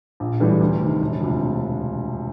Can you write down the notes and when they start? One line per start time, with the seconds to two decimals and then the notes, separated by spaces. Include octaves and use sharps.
0.20 A#1
0.40 A2 E3 G3
0.60 D2
0.81 C3 D#3
1.01 E1
1.21 D2 C3 F3